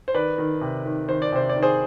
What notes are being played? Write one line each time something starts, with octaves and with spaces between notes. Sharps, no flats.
C5
D#3 B4 D5
D#3
C3
D#3
D#3 C5
D5
C3 C5
D5
D#3
G#4 C5